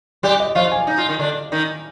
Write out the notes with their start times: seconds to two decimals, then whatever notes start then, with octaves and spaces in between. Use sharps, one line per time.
0.23 G3 G4 D5
0.40 D#5
0.55 F3 F4 F5
0.72 G#5
0.87 D#4
0.98 F4
1.09 D#3 D#4
1.19 D3 D4
1.52 D#3 D#4